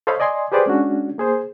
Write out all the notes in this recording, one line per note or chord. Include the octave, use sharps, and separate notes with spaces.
A4 C5 C#5 D#5 F5 B5
D5 D#5 G#5 C6
G4 G#4 B4 C5 D5
G#3 C#4 D4 F#4
A#3 G#4 C5